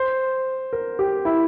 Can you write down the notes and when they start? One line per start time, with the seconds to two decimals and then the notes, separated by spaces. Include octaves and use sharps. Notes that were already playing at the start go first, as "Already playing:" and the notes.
Already playing: C5
0.73 A#4
0.99 G4
1.25 E4